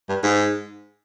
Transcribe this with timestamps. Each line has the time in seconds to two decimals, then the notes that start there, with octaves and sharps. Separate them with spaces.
0.09 G2
0.23 G#2